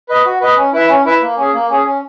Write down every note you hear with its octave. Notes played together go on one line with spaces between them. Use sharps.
B4 D#5
F#4
B4 D#5
C#4
E4 B4 E5
C#4
E4 B4 E5
A#3
C#4 G#4
A#3
C#4 G#4
C#4